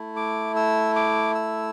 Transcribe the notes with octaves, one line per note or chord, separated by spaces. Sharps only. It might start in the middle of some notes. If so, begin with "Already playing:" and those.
Already playing: A3 E4
D6
E6
D6
E6